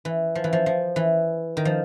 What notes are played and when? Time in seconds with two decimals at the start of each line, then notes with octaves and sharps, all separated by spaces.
0.05 E3
0.35 F3
0.44 E3
0.53 F3
0.66 F3
0.96 E3
1.57 D#3
1.65 F3